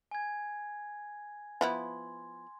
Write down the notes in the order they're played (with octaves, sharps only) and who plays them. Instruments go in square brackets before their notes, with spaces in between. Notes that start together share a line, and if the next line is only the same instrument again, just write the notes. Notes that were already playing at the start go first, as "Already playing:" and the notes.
[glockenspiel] G#5 G#6
[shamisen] F3 B3 E4 [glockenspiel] C6